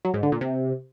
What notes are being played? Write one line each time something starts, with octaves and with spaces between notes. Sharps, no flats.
F#3
G#2
D3
A#2
C3